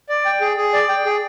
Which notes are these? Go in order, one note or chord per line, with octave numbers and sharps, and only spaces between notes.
D5
G5
G#4
G#4
D5
G5
G#4